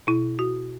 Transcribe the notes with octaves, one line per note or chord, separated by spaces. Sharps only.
B2 E4
F#4